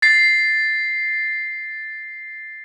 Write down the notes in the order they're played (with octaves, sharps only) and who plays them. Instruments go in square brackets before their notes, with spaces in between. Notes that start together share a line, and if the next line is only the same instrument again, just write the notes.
[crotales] A6 C7